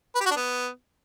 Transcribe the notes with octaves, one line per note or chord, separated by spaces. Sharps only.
B4
G4
F#4
D4
B3